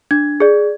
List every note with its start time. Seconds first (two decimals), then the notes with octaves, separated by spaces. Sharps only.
0.11 D4 G#6
0.40 G#4 D5